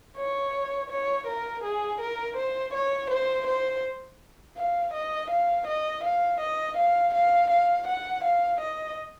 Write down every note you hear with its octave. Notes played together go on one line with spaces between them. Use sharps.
C#5
C#5
A#4
G#4
A#4
C5
C#5
C5
C5
F5
D#5
F5
D#5
F5
D#5
F5
F5
F5
F#5
F5
D#5